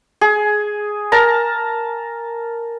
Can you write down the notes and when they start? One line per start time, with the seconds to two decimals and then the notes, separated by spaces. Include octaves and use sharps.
0.21 G#4
1.12 A#4 A5 A#5